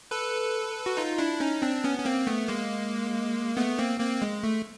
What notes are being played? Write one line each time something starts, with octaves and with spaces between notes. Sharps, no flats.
A4 B4
F#4
D#4 F4
D4 E4
C#4 D#4
C4 D4
B3 C#4
C#4
A#3 C4
A3 B3
G#3 A#3
A3 B3
A#3 C4
A#3 C4
G#3
A3